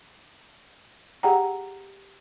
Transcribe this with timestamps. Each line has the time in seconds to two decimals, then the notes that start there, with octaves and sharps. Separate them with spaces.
1.23 G4 G#4 F#5 G5 A#5